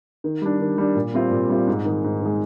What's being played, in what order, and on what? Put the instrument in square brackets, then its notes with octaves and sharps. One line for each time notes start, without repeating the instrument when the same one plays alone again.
[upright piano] D#3
G3 D4
D#3
G3 D4
A#2
G3 C4 F4
A#2
G3 C4 F4
G#2
D#3 G#3
G#2
D#3 G#3